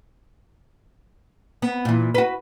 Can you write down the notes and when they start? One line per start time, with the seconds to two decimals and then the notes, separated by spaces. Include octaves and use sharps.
1.62 B3
1.85 A#2 E3
2.15 F#4 B4